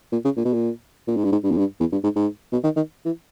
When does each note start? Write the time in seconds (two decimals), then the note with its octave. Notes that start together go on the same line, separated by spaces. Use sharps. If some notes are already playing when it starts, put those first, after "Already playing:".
0.12 A#2
0.25 C#3
0.37 A#2
0.45 B2
0.54 A#2
1.08 A#2
1.17 G#2
1.24 G2
1.32 G#2
1.44 G2
1.52 E2
1.58 G2
1.80 E2
1.92 G2
2.04 G#2
2.16 G#2
2.53 B2
2.64 D#3
2.76 D#3
3.05 E3